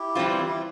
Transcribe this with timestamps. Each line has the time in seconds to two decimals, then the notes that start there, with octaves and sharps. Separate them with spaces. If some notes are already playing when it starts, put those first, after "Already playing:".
Already playing: E4 G4
0.15 E3 G3 C4 F4
0.48 E4